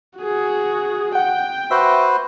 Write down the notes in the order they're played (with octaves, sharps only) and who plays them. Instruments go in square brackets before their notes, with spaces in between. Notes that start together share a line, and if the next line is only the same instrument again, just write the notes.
[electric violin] F#4 G#4
[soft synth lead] F#5 [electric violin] G5
[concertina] F#4 B4 C5 [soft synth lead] E5